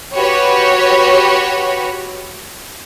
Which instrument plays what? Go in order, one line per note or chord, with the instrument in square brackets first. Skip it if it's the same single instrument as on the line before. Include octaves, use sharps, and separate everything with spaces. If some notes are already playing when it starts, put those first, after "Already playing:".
[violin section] F#4 G4 B4 C#5